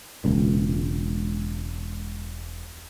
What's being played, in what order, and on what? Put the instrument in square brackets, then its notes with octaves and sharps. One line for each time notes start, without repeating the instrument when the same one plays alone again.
[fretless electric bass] E1 C#2 A#2